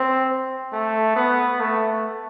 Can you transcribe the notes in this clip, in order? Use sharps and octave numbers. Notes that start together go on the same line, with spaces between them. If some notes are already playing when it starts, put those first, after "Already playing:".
Already playing: C4
A3
B3
A3